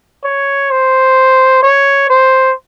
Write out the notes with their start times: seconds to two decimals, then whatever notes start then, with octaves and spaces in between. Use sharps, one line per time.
0.24 C#5
0.71 C5
1.63 C#5
2.10 C5